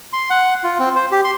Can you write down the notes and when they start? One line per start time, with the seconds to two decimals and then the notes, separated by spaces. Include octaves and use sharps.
0.13 C6
0.30 F#5
0.64 F4
0.79 C4
0.96 C5
1.11 G4
1.24 C6